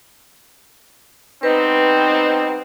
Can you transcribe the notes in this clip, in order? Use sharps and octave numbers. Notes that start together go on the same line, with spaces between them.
G3 B3 C4 D#4 B4